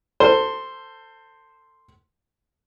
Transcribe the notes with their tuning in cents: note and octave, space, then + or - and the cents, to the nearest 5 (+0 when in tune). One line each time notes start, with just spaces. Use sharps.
A4 +25 C5 +0